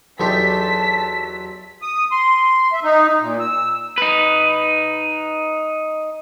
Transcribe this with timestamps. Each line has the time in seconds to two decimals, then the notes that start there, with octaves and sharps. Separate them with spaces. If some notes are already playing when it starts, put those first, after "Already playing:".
0.20 E2 F#3 D#4 G4 A4 A5 C6 B6
1.82 D#6
2.12 C6
2.72 E5
2.84 D#4
3.21 A#2
3.40 E6
3.98 D#4 B4